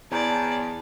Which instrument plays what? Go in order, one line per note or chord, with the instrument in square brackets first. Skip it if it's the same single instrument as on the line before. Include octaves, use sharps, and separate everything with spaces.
[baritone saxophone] E2 [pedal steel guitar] C#5 A#5 G6 [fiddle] D5 [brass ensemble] A5